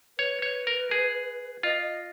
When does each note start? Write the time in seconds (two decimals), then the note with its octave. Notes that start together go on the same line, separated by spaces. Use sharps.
0.18 B4 C#5
0.42 C#5
0.67 A#4
0.91 G#4
1.63 F4 D#5
1.82 D#5